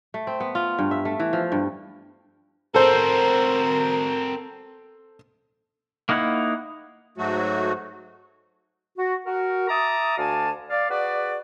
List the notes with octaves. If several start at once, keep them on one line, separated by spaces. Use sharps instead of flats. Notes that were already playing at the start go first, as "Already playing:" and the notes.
A3
C4
B3
F4
G2
E5
A3
E3
F3
G2
C4 F#4 A4 A#4 C5
A#3 D#4 E4 F#5
G#2 F#3 A3 F#4
F#4
F#4 A#4
E5 A5 A#5 D6 D#6
D2 F#4 D5 F5 G#5 A5
D5 F5
F#4 G#4 B4 D5